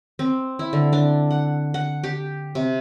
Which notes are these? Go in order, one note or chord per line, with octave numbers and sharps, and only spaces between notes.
C4
E4
D3
D4
F#5
F#5
G4
C3